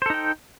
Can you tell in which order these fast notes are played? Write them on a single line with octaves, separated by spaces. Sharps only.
C5 A4 D#4 G5